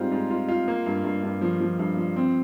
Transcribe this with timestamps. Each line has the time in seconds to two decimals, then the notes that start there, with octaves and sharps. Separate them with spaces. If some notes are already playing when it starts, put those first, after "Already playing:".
Already playing: G#2 G3 C4 F4
0.12 G#2
0.30 F4
0.48 F4
0.68 A#3
0.86 G2
1.04 G2
1.23 G2
1.41 F3
1.60 F3
1.79 G2
1.97 F3
2.16 C4